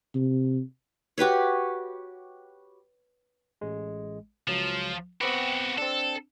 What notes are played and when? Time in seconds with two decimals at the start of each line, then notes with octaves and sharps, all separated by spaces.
0.15 C3
1.18 F#4 G4 B4 C#5
3.61 A1 G#3
4.48 C#2 F3 F#3
5.21 B3 C4 F#4 G4 B4
5.78 C4 D4 A4